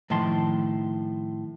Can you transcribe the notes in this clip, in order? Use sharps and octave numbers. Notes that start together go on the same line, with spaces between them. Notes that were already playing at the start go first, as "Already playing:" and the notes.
A2 D#3 F3 A5 C6